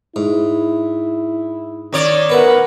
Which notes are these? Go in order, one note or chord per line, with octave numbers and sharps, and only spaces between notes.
G#2 E4
D#3 C#5 D5
B3 A#4 B4 E5 F#5